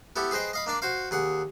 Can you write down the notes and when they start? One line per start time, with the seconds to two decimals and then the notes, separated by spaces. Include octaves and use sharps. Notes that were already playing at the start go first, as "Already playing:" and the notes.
0.16 B3 E4 G4 A4
0.31 G#4 B4 C5 D#5 G5
0.53 D#5 F5 B5
0.66 A#3 D4 D5
0.82 F#4 C5 F5
1.11 D#2 G#4 F#5